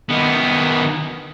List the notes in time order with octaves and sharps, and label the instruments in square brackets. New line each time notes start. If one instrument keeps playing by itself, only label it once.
[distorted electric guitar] D#3 B3